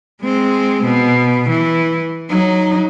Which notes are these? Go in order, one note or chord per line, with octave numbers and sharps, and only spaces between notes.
G#3 C4
B2
E3
F#3 D#4